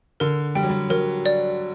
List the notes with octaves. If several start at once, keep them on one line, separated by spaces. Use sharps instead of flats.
D3 A#4
G3 G5
F#3
G3
F#3 A#4
D5